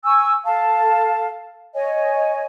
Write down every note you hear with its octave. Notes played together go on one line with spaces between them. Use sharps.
G#5 C#6 E6
A4 F5 A5
C#5 D#5 G#5